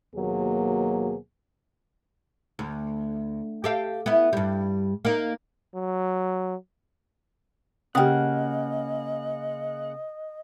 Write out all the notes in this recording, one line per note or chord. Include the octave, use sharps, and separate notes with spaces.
D#2 B2 F#3 A#3 G#4
D2
G4 A4 F5
B3 E4
G2 G3
A#3 D#4
F#3
C#3 A#3 G4 D#5 F#5 G5 D#6